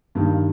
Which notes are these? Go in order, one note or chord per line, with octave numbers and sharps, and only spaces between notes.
G2 D#3 A#3